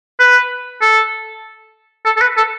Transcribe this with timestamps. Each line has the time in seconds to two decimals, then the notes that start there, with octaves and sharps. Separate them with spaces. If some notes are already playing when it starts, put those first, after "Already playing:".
0.20 B4
0.82 A4
2.06 A4
2.17 A4
2.21 B4
2.37 A4